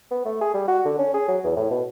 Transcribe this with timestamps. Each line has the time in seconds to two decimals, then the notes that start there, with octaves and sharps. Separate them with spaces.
0.11 B3
0.25 A3
0.41 G#4
0.54 G3
0.68 F#4
0.85 D3
0.99 C#4
1.14 G#4
1.28 F#3
1.44 E2
1.56 A2
1.71 B2